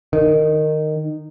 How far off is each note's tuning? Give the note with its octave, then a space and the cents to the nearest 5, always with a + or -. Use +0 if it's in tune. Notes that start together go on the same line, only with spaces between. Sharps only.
D#3 -15